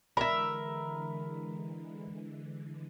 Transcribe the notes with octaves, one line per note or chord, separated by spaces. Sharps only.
D3 E3 G#3 A#4 E5 B5